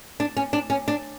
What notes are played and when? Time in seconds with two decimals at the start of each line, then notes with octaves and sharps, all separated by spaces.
0.20 D4
0.37 C#4
0.53 D4
0.70 C#4
0.88 D4